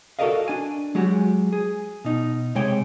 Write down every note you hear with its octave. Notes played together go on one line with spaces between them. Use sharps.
F#4 A4 A#4 D5 D#5 F5
D4 G#5
F#3 G#3 F#4 G4
G#4
B2 D#4
C3 G#3 C#5 G5